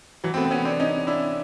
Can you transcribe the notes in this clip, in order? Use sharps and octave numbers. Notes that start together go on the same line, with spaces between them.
E3 F#3
C4
A3 B3
C4
B3 C#4
C4 D4
C#4 D#4
D4 E4